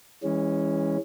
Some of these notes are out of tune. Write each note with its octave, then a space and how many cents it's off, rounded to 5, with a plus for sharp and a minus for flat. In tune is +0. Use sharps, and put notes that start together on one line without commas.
E3 -15 G#3 -35 C#4 -5